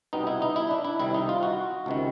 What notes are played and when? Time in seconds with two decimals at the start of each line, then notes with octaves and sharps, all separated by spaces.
0.13 C2 B2 G3 B3 D#4
0.27 E4
0.42 D#4
0.56 E4
0.71 D4
0.85 E4
0.99 C2 C3 D#3 G3 E4
1.14 D#4
1.29 F4
1.43 F#4
1.86 C#2 C3 D#3